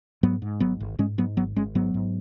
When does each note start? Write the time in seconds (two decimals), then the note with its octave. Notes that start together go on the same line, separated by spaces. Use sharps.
0.23 G#2 F#3 B3
0.42 G#2
0.60 G#1 F#3 B3
0.80 G#1
0.99 G#2 G#3 C#4
1.18 G#2 F#3 B3
1.37 G#1 F#3 B3
1.56 G#1 G#3 C#4
1.75 G#2 F#3 B3
1.94 G#2